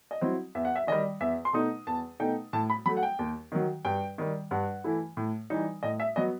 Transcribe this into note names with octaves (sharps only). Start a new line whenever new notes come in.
D#5
F#3 C4 E4
E2 E5
F#5
E5
D#3 G3 D#5
E2 E5
C6
B2 A3 D#4 D#6
E2 A5
B2 A3 D#4 G5
A2 A5
B5
F#3 A3 B5
F#5
G5
D#2
D#3 F#3
G2 G5
D#3 G3
G2 F#5
E3 A3 E4
A2
E3 G3 D#4
A2 D#5
E5
F#3 B3 D#5